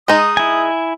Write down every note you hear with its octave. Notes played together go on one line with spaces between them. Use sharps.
G#3 D#4 D#6
E4 G#5